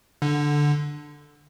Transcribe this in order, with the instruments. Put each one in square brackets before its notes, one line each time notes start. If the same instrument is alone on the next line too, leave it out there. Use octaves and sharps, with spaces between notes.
[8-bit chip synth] D3